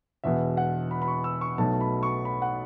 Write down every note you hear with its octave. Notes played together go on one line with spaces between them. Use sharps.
E1 E2 B2 E5
F#5
B5
B5
C#6
E6
C#6
B1 B2 F#3 A3 A5
B5
C#6
B5
F#5